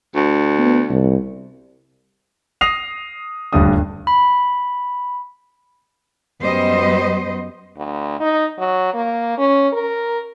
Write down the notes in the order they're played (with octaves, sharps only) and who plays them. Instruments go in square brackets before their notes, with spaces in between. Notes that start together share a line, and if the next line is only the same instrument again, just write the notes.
[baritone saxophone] D2
[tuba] B3
C2
[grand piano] D#6 A#6 C7 F7
D#1 D2 G2 D4 D#6
[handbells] B5
[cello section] F#2 G3 B3 C5 D#5
[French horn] D2
D#4
F#3
A#3
C#4
A#4